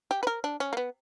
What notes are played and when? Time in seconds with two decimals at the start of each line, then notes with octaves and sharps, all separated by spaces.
0.11 G4
0.23 B4
0.27 A#4
0.44 D4
0.60 C#4
0.73 A#3
0.77 B3